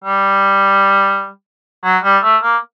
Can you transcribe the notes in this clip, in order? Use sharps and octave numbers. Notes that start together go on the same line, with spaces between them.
G3
F#3
G3
A3
A#3